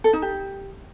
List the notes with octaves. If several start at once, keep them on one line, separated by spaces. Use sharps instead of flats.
A4
D#4
G4